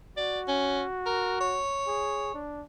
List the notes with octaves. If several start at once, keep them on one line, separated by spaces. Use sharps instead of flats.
F#4 D5
C#4
A#4
C#5
G#4
D4